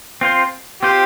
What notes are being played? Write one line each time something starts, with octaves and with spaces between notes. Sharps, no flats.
C4 F4 C5
C4 F4 G4 C5